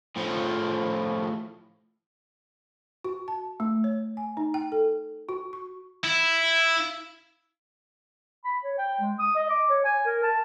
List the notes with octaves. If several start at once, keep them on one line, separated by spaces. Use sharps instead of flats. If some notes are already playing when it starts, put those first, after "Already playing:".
A2 F3
F#4
A5
A3
C#5
G#5
D#4
G5
A4
F#4
C#6
E4
B5
C#5
G5
G#3
D#6
D#5
D6
C#5
G#5
A#4
A5